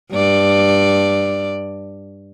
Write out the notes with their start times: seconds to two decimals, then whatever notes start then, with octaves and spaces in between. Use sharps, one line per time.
0.12 G2 D5